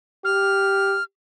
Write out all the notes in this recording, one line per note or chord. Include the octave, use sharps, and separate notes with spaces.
G4 F6